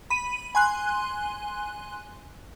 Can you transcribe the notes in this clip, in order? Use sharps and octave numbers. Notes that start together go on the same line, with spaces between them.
B5 D#7
G#5 C6 F#6